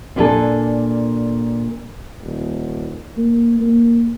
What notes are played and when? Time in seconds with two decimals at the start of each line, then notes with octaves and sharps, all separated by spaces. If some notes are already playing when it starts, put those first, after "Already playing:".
0.16 A#2 D4 E4 F#4 G#4 A4
2.23 D#1
3.17 A#3
3.60 A#3